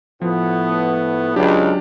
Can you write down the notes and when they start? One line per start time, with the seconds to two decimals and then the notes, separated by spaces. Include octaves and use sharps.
0.22 A2 F3 B3
1.36 C#2 F#3 D4 G4